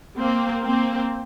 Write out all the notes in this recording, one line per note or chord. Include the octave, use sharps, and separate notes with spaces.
A#3 C4
A#3 C4